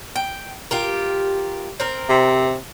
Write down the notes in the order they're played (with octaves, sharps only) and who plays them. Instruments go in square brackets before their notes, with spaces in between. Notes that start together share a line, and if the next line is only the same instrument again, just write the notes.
[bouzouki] G5
F4 G4 A#4
C4 A#4
[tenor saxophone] C3